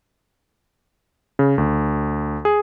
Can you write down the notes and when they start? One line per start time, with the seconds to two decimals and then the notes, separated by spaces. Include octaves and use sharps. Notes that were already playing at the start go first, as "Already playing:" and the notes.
1.39 C#3
1.58 D2
2.45 G#4